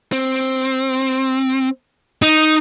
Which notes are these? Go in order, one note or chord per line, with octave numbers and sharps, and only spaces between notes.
C4
D#4